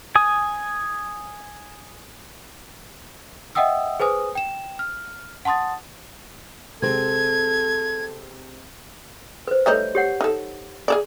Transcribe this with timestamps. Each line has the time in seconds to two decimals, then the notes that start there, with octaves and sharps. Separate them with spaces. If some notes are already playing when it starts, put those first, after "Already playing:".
0.15 G#5 D#6
3.55 D#5 E5 F#5 G5 D#6 E6
4.00 G#4 B4 C5 G#5 D#6
4.35 G5 E7
4.79 F6
5.45 F#5 A5 C6 D#6 A6
6.82 C3 G#3 C4 A4 G#6
9.47 B4 C5
9.66 G3 A3 D#4 B4 C#5
9.95 G4 C#5 F#5
10.21 D#4 A4
10.88 G#4 A4 D5